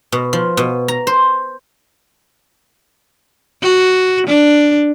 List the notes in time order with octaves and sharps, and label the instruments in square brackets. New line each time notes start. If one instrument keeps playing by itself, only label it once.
[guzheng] B2
F3
B2
A#5
C5
[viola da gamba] F#4
D4